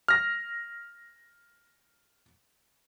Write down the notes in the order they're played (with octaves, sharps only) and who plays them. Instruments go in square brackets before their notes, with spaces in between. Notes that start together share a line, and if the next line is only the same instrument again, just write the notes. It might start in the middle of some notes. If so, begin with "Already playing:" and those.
[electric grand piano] F6 A#6